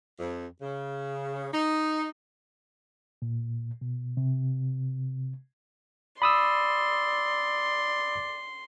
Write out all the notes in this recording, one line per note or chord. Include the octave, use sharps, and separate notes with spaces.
F2
C#3
D#4
A#2
B2
C3
D5 B5 C6 D#6 E6